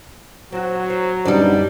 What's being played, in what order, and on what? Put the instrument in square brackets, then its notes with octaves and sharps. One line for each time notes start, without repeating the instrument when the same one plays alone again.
[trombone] F#3 [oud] C4 F#4
[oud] C5
[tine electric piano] F#2 D4 D#4 [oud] D3 B3 [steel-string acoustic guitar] G3 D5